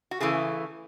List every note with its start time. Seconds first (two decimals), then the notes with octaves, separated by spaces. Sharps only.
0.11 F#4
0.20 C#3 E3 A3 G#4